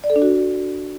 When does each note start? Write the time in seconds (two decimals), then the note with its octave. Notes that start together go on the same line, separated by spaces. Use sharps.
0.04 D5
0.10 A4
0.16 D4
0.22 F#4